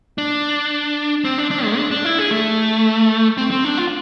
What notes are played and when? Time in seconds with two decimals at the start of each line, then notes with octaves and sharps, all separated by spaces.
0.18 D4
1.25 C4
1.38 D4
1.51 D4
1.65 G#3
1.78 D4
1.91 D4
2.05 E4
2.18 G#4
2.31 A3
3.38 C4
3.51 C4
3.65 D4
3.78 F4